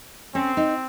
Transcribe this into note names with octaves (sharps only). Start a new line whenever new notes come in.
C4 C#4
D#4